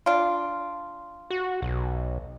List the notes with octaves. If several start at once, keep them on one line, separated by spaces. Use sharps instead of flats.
D4 F4
F#4
B1